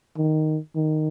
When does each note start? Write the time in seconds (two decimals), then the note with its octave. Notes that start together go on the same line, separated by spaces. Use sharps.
0.17 D#3
0.76 D#3